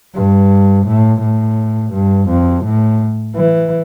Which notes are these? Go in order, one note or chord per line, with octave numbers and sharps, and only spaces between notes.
G2
A2
A2
G2
F2
A2
E3